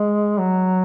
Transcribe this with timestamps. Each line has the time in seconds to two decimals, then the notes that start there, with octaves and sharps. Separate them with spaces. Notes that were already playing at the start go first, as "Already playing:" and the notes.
Already playing: G#3
0.38 F#3